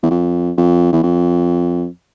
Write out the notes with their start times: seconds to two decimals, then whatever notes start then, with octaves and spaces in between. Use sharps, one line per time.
0.03 E2
0.10 F2
0.57 F2
0.92 E2
1.03 F2